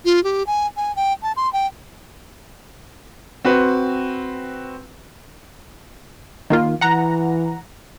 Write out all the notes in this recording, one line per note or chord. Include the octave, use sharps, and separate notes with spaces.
F4
G4
G#5
G#5
G5
A5
C6
G5
C4 F#4 B4
D#3 A#3 F4
E3 F#5 A#5